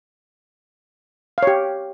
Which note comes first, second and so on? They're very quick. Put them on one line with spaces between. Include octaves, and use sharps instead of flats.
F5 C#5 G4